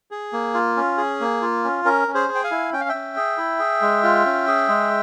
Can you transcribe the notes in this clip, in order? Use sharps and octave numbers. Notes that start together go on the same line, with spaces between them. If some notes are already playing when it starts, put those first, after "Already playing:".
G#4
A#3
F4
C#4
G#4
A#3
F4
C#4
C#4 A#4
C#4
G#4 C5
G#4
G5
F5 G#5
E4
C#4 G5
F5
E5 G5
C#4
G#4
E4
G#4
G#3
F4
C#4
G#4
G#3